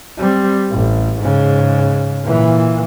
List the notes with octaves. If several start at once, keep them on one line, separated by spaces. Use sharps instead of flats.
G3 C4
A1
G#2 C#3
A#2 E3